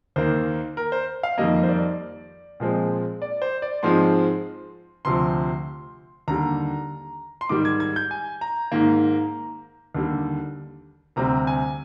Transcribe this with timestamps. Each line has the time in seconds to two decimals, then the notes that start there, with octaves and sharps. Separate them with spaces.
0.16 D#2 D#3 A#3 C5
0.77 A#4
0.92 C5
1.23 F5
1.38 F2 D#3 G3 A#3 D#5
1.63 C5
1.69 D5
2.60 A#2 F3 G#3 C4
3.22 D5
3.42 C5
3.62 D5
3.83 G#2 F3 G#3 C4 C6
5.05 D2 C3 F3 C6
6.28 D#2 D3 G3 A#5
7.41 C6
7.49 G#2 D#3 G3 D6
7.65 G#6
7.80 G#6
7.96 G6
8.11 G#5
8.41 A#5
8.72 G#2 D#3 A#3
9.95 D#2 D3 G3
11.16 D2 C3 G3 C4 A#5
11.47 G#5